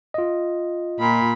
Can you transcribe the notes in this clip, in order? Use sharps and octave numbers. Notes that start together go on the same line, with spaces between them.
F4 D#5
A#2 B5